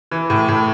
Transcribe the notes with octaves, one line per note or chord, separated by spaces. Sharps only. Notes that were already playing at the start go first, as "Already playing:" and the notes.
E3
A2
A2